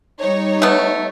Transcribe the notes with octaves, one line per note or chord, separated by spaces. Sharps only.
G3 D#4 C#5
A3 B3